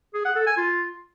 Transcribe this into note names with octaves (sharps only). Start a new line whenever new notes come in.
G#4
F#5
A4
G#5
F4